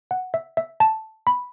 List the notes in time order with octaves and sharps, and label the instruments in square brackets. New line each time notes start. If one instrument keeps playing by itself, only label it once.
[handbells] F#5
E5
E5
A5
B5